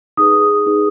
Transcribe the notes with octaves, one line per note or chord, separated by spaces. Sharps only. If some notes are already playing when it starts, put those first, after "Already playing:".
D#4 G#4 B4 D#6
D#4 G#4 B4